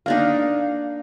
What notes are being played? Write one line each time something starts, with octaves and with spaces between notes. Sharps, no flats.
A#3 D4 D#4 F5